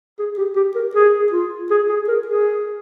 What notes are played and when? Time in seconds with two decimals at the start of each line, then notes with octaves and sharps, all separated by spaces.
0.19 G#4
0.38 G4
0.56 G4
0.75 A#4
0.95 G#4
1.32 F4
1.70 G#4
1.89 G#4
2.08 A#4
2.27 G#4